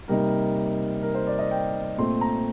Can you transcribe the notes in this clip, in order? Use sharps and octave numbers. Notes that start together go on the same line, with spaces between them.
C3 G3 A#3 D#4 A#4
A#4
C5
D5
D#5
G5
A#2 A3 C4 C6
A#5